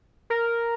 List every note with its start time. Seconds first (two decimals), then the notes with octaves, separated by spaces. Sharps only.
0.30 A#4